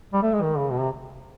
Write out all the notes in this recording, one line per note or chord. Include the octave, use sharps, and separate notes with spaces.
G3
A3
G#3
D#3
C#3
B2
C3